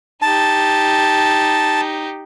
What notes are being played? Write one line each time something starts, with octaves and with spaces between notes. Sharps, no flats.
D#4 G4 A5